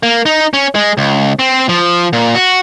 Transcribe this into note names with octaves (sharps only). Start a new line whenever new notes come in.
A#3
D#4
C#4
G#3
C#2
C4
F3
A#2
F#4